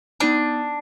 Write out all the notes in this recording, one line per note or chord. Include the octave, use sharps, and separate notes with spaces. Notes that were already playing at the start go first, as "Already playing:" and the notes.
B3 D4 D#4 D#7